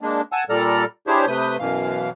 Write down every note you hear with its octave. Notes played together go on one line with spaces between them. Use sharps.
G#3 A#3 D4
F#5 G#5 A5 E6
A#2 G3 A4 D5 A#5 F6
D4 E4 G4 G#4 C5 C#5
C3 A3 B4 D#6 G6
F#2 B2 E3 F5